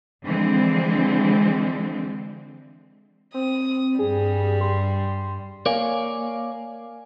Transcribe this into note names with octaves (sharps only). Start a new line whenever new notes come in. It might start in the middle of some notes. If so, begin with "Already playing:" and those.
D3 E3 F3 G#3 C4
C4 D#6
G2 G3 G#4
C6
A#3 A#4 C#5 D5 F5 G#5